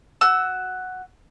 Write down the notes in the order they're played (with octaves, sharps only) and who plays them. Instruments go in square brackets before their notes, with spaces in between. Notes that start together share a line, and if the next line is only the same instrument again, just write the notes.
[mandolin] F#4 E6